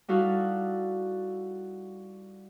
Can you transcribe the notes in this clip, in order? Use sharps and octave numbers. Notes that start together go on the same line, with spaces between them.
G3 D#4 E4 F#4 A4 F5